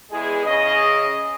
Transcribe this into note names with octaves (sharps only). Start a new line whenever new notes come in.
E2 G#3 E4 G#4
C#3 D#5